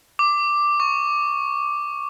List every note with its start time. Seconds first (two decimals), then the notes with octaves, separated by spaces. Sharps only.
0.19 D6
0.80 C#6